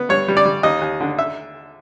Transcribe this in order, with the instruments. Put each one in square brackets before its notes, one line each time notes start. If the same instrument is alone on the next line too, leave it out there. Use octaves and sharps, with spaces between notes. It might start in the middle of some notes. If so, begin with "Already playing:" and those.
Already playing: [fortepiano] B3
G2 C#5
G3
D5
G3
D#2 D#5
D#2
D3
E5